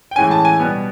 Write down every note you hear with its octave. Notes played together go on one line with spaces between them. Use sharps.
G5
A2 E3 G#3 C#4 G#5
A5
G#5
B2 G3 B3